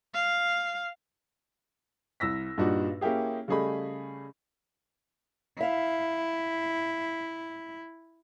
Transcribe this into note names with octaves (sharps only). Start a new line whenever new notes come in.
F5
C2 E6 A#6 B6
G2 A#2 G3 D4 D#4 F#4
A#3 C#4 E4 G4 G#4
C#3 G3 A3 G#4 D#5 B5
E4 E5 F5